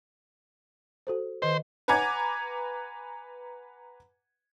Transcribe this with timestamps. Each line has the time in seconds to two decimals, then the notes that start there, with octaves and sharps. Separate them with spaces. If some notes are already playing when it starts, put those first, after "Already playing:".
1.07 F#4 A4 C5
1.42 D#3 B4 C5 D#5
1.88 B4 F#5 G#5 A#5 D6 G#6